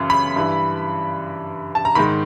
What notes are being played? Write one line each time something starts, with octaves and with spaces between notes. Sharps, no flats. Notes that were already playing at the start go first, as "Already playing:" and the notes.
Already playing: F#2 C#3 E3
B5
G2 E3
A5
A#5
G#2 D#3 B5